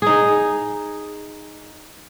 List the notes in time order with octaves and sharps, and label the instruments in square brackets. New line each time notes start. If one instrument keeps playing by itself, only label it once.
[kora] D#4 G#4